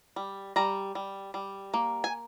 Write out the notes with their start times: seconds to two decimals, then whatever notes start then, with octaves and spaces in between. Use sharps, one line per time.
0.16 G3
0.56 G3 A#5
0.95 G3
1.34 G3
1.74 A#3
2.04 G#5